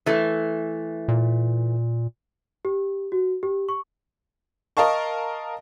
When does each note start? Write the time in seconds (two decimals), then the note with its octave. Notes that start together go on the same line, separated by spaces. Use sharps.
0.06 E3 A3
1.08 A#2
2.65 G4
3.12 F#4
3.43 G4
3.69 C#6
4.77 A#4 D#5 F5 A5 C#6